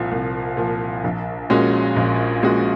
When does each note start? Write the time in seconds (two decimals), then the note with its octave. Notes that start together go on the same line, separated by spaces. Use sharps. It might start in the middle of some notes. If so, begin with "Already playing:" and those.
Already playing: C2 A#2 F3
0.11 C2
0.57 A#2 F3
1.04 A#1
1.50 A#2 G#3 C#4 F#4
1.96 A#1
2.43 A#2 G#3 C#4 F#4